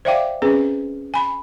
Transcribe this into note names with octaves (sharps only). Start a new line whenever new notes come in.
C5 D5 E5 F5 G5 D6
C4 C#4 G#4 B4
G#5 B5